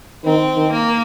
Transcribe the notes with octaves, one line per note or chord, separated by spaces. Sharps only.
D#3 C4
D#3
A#3